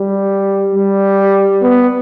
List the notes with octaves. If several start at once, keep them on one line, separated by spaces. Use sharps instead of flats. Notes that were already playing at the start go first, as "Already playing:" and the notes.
Already playing: G3
G3
B3